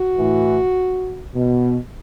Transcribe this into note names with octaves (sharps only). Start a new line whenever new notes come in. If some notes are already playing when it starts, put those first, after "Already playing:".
Already playing: F#4
A2 E3
B2